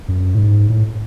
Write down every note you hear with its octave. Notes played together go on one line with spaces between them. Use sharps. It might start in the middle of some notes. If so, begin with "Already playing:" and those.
F#2
A2
G#2
A2